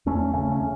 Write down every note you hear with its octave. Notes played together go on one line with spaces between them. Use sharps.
E2 A3 C#4
C#3 A3 C#4
C#4
C#3